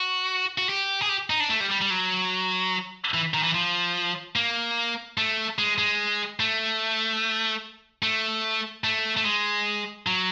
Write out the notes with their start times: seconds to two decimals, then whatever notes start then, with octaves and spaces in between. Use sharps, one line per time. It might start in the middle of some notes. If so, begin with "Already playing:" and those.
Already playing: F#4
0.58 F#4
0.69 G4
1.02 G#4
1.09 G4
1.30 D#4
1.40 D4
1.50 A3
1.60 G3
1.71 G3
1.81 G3
1.91 F#3
3.14 E3
3.34 D#3
3.43 E3
3.54 F3
4.36 A#3
5.18 A3
5.58 G#3
5.78 G#3
6.40 A3
8.03 A3
8.84 A3
9.17 A3
9.24 G#3
10.07 F#3